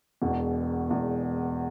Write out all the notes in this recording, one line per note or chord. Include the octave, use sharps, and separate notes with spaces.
E1 E2 B2
E1 E2 B2